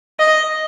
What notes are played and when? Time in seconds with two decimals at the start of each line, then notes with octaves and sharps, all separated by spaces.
0.19 D#5